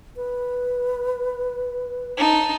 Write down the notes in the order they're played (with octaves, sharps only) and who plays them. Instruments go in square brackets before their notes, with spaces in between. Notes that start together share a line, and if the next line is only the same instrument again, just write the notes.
[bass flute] B4
[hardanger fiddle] D#4 A5